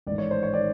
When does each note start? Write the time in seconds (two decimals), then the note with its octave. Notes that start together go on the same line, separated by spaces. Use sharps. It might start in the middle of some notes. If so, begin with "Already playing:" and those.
0.07 A1 G#2 D#3 D5
0.18 C#5
0.31 C5
0.43 C#5
0.54 D#3 D5